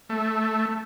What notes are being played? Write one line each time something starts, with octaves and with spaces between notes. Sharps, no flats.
A3